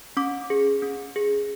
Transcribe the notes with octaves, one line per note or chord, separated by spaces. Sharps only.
C#4 D6
G#4
C#4
G#4